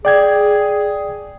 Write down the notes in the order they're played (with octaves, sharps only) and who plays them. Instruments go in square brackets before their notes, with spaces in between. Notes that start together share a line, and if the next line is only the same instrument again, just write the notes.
[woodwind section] G#4 [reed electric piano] D5 G5 G#6